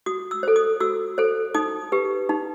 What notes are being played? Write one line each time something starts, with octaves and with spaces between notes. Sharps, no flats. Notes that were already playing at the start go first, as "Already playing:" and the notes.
F#4 D#6
E6
A4 C5
D#6
F#4 E6
A4 C5
D#4 D#6
G4 B4
D#4